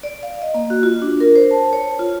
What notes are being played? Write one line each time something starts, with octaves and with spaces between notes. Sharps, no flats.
D5
F5
D#5
A#3
F#4
F4
D4
A#4
C5
A5
C#5
F4